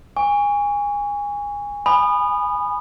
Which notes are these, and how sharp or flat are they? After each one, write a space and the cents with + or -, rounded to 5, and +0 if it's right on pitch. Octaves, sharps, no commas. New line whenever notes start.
G#5 -20 C#6 +25
G#5 +0 B5 +0 D#6 -25